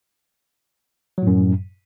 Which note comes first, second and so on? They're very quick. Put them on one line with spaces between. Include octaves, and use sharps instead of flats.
F#3 A2 F#2